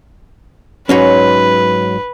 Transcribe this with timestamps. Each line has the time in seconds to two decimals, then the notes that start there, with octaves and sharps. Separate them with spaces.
0.89 G#2 F#3 C#4 B4